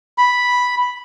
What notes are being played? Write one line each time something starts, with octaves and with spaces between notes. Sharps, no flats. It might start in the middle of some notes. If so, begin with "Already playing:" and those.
B5